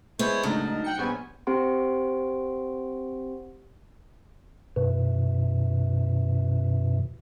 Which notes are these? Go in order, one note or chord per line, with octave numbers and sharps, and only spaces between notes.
G#3 B3 E4 C5 C#5
C#2 A2 F#3 D4 D#4 A#4 A5
F#5 G5 C#7
A#1 G3 B3 C#4 C5 G#5
C4 G4 C5 F#5 C6 D7
F#2 B2 E3